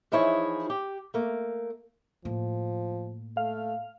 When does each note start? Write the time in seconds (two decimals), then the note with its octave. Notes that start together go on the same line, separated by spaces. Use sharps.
0.12 E3 F3 D#4 E4 G#4 C#5
0.70 G4
1.14 A3 A#3
2.25 A2 F3 A#3
3.37 A3 F5